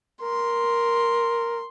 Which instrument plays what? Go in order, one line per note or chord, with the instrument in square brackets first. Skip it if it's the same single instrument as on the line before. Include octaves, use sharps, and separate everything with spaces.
[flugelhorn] A#4 [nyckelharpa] C6